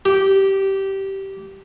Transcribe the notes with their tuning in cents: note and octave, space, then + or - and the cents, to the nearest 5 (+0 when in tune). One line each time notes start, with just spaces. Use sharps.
G4 -15